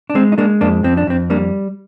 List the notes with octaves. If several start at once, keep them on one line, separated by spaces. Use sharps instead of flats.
D4
G#3 C4
D#4
G#3 A#3 D4
F2 A#3 D4
F2 C4
D4
F2 C4
G3 A#3 D4